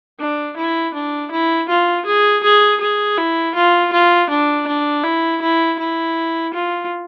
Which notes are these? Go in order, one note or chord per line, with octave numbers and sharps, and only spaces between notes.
D4
E4
D4
E4
F4
G#4
G#4
G#4
E4
F4
F4
D4
D4
E4
E4
E4
F4